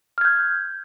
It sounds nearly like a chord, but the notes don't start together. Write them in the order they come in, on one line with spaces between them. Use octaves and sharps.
F6 G#6 G6